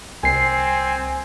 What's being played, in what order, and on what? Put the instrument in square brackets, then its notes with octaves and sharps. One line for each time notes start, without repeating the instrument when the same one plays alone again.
[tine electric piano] C2 C7 [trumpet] C4 [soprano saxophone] G#5